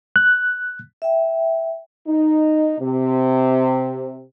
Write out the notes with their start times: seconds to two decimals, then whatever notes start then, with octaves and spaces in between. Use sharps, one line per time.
0.16 F#6
1.02 E5 G5
2.07 D#4
2.79 C3